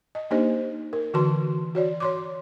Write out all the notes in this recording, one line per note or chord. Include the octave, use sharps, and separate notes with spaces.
D#5
A#3 D4 D#4 G4 C5 D#5
A#4
D3 E3 F#4 B4 A5 C6
F#4 C#5 D5
C#5 C6 D6